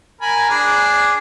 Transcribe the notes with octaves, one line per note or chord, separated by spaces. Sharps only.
A#4 G#5 B5
D4 G#4